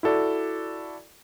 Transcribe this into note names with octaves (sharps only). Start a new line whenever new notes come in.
E4 F#4 A4 D5